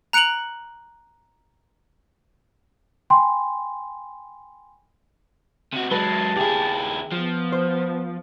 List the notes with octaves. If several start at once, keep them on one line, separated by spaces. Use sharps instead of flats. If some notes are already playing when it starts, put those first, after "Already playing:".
A#5 F#6 C#7 D7 F7 F#7
G5 G#5 B5 C6
C3 F#4
F#3 G#3 B4 A5
D#2 E4 G4 G#4
F3 B3
C5